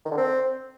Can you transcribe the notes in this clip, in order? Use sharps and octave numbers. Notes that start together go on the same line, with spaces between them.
D#3
D3
C4